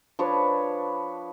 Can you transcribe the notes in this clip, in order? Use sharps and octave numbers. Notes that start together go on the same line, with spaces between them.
F3 D4 B4 C#5